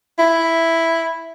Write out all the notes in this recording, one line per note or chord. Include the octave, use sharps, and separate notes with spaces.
E4